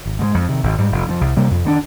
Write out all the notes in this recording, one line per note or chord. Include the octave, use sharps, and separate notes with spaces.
G#1
G#2 F3 G#3
F2
C3 D#3
G#1
G#2 G3
F1
F2 C3 F3
C2
C3 G3 A#3
F2
D#3 A#3 D4